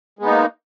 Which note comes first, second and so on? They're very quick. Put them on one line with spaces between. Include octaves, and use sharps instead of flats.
G#3 B3 D#4 A#3